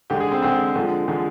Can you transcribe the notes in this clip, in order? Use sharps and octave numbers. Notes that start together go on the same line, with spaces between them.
D3 G#3 G4
G#4
C4
D3 G#3 C4
D3 F3 G#3
D3 F3 G#3